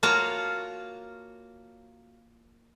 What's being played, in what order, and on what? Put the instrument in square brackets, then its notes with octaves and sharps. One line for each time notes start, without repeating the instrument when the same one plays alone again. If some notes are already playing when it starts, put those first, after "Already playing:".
[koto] A#3 F4 F#4 C#5 A5 A#5